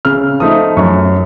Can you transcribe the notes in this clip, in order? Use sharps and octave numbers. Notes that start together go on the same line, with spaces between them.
C#3 F6
F3 A3 D#4 D#6
F#2 C#6